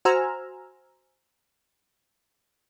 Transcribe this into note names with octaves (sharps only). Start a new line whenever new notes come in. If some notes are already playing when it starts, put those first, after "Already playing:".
F#4 C5 G#5 A#5 E6 F6